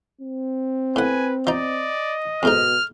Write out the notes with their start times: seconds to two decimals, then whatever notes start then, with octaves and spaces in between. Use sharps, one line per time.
0.21 C4
0.96 A2 B4 F#5 G#5
1.47 F3 D#4 D5 D#5
2.43 F2 G#2 B2 D#4 F6